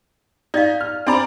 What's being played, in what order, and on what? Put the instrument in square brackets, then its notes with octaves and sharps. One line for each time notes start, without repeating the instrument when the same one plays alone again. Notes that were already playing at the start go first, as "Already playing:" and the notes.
[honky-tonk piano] D#4 [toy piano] D5 D#5 F5
[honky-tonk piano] F6
[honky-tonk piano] C4 D5 A#5 [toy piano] D4 G#5 B5